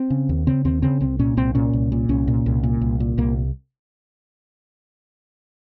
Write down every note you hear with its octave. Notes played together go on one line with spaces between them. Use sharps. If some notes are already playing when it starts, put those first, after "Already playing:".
Already playing: C4
C#3
D#2
C#3 C4
D#2 C4
C#3 C4
C2 C4
A#2 C#4
C2 C4
A#2 C#4
C2
A#2
C2 C#4
A#2
C2
A#2
C2
A#2
C2 A#3